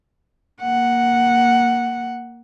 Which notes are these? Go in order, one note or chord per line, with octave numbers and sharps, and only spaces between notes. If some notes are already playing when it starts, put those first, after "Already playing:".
A#3 F#5